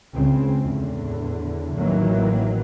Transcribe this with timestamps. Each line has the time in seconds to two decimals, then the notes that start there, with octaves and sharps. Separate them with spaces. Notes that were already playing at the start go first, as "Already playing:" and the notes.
0.13 C#2 C#3 C4
0.61 E2 A2 D3
1.76 A1 D#3 E3 F#3 A#3